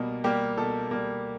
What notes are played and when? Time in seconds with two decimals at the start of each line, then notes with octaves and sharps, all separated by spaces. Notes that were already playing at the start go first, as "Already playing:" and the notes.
Already playing: B2 G3 A#3
0.24 G3 A#3 G4
0.58 B2 A4
0.91 G3 A#3